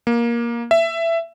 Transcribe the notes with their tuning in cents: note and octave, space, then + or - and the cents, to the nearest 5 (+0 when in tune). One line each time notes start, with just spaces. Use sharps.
A#3 +15
E5 +15